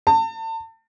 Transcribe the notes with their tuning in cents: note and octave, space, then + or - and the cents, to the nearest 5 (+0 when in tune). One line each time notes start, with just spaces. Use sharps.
A5 +35